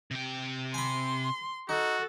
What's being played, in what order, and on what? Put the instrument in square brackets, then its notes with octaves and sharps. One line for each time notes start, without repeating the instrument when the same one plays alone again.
[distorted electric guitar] C3 G5
[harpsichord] G#5 B5 [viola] C6
[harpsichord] D#4 [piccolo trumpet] F#4 [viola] A4